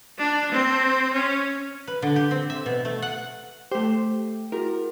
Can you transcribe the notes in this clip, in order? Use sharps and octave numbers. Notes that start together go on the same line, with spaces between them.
D4
C4
C#4
B4
D3
G4
C4
E5
B2
A3
F#5
A3 G4 C5
E4 F#4 G#4 A#4